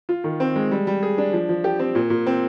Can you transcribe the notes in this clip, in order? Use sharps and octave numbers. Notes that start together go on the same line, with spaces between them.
F4
D#3
C4
G#3
G3
G3
G#4
D4
F3
F3
G4
C4
A#2
A#2
C4